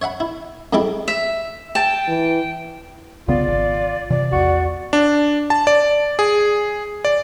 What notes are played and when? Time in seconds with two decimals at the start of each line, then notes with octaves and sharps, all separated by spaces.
0.02 C#5 E5 F#5 B5
0.20 E4
0.73 F2 G#2 G3 E4 A4 D6
1.08 E5
1.75 G5 A5
2.08 E3
3.28 C2 C#3 B3 F4 D5
3.48 G#1
4.10 C3 E3 D5
4.32 A#1 E2 F#4
4.93 D4
5.50 A5
5.67 D5
6.19 G#4
7.05 D5